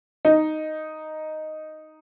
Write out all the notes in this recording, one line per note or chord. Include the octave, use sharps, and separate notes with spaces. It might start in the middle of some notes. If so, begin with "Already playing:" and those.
D#4